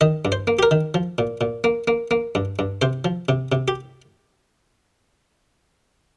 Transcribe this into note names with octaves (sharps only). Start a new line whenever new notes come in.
D#3 D#5
G2
C5
A#3
G4
A#4
D#3
F3
A#2
A#2
A#3
A#3
A#3
G2
G2
C3 C5
F3
C3
C3
G4